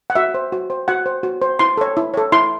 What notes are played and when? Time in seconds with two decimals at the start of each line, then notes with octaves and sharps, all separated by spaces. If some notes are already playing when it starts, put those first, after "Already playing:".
0.10 F#5
0.15 F#4 E5
0.34 C5
0.52 F#4
0.70 C5
0.88 F#4 F#5
1.06 C5
1.23 F#4
1.42 C5
1.59 E4 C6
1.77 A4 C#5
1.97 E4
2.14 A4 C#5
2.32 E4 C6